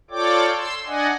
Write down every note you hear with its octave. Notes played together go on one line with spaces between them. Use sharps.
F4 A4 C#5 D5 G5 D6
C6 E6
D4 D5 D#5 F#5 G#5